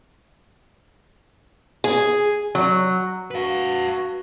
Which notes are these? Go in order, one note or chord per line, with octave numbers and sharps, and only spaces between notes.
G#4
F#3
F#4 B4 F5